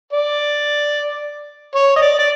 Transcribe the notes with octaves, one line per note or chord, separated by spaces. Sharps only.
D5
C#5
D#5
D5
D5